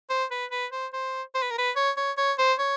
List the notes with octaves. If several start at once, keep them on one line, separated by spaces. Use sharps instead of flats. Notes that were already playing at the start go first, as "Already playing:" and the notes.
C5
B4
B4
C5
C5
C5
B4
A#4
B4
C#5
C#5
C#5
C5
C#5